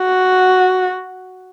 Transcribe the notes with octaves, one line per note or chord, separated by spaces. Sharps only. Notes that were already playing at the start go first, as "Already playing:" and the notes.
Already playing: F#4